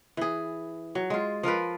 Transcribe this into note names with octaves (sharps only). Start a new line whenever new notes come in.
E3 G#4
F#3
G#3 F4
F3 F4 A#4 B4